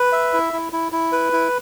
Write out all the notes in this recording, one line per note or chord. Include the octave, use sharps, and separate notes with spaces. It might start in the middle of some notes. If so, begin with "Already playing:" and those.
Already playing: B4
E5
E4
E4
E4
E4
B4
E4